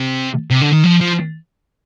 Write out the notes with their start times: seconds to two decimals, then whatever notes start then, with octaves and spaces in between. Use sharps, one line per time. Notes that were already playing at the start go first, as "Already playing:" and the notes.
Already playing: C3
0.51 C3
0.61 D3
0.73 D#3
0.84 F3
1.00 F3